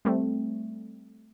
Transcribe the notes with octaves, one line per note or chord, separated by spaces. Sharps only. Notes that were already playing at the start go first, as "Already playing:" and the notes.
G3 A3 C4